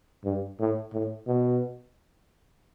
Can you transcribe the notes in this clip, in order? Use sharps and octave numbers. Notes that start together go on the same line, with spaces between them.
G2
A2
A2
B2